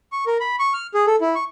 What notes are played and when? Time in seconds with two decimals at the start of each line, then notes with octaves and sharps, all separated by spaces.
0.12 C#6
0.26 A#4
0.40 B5
0.59 C#6
0.74 F6
0.94 G#4
1.07 A4
1.21 E4
1.35 C#6